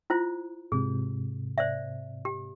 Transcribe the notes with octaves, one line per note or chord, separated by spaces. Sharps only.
E4 F4 C5
G#2 C3 G#4
C5 D5 E5
G4